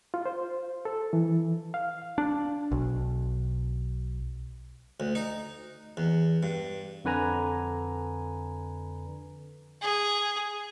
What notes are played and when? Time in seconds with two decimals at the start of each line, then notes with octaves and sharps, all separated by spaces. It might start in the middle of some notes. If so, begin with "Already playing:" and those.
0.14 F4
0.26 C5
0.85 A4
1.13 E3
1.74 F5
2.18 D4
2.72 B1
5.00 D2
5.15 D#4
5.97 E2
6.43 G2
7.05 F2 D3 B4 G#5 A#5
9.82 G#4